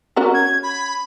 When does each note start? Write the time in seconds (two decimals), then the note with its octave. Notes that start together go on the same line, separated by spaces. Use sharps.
0.16 C#4 F#4 A#4
0.34 G#6
0.63 B5